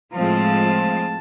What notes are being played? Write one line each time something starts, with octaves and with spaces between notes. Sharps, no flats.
A2 F3 G#3 C4 F4 A5